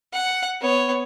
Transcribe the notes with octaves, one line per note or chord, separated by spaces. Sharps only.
F#5
B3 C#5